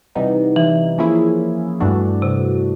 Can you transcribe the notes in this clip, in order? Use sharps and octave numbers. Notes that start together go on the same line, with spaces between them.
C3 E3 G3 B3 D#4
E3
F3 A#3 C#4 E4 G#4
G2 E3 A3 D4 F#4
C3